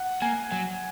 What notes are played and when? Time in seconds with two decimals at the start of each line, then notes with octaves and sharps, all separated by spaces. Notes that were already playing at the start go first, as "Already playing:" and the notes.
Already playing: F#5
0.22 A#3 G#5
0.52 F#3 G#5